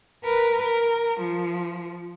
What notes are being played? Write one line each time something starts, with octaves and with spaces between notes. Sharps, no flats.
A#4 B4
A#4
F3